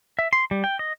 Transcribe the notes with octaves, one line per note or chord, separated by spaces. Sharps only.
E5
C6
G3
G5
D#5